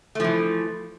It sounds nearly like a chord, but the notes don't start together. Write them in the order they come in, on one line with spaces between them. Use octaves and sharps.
A3 F3 E3